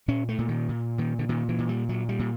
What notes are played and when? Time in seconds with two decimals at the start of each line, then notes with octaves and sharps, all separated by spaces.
0.08 A#2 C#4
0.29 A3
0.38 A#2
0.49 D#3
0.69 A#2
0.98 A#2 D#3
1.19 D3
1.29 A#2 D#3
1.49 E3
1.59 A#2
1.69 G3
1.89 A#2 F#3
2.09 G3
2.19 A#2